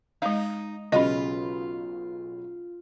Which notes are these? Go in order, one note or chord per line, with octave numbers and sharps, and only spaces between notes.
G#3 D#4 F5
B1 C#3 F4 D#5 B5